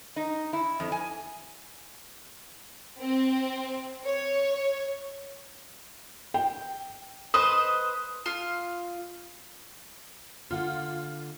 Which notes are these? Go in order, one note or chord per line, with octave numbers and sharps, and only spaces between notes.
D#4
E4
F2
G#5
C4
C#5
G5
B4 C5 D#5 D#6
F4 F6
D3 A#3 F4 F#5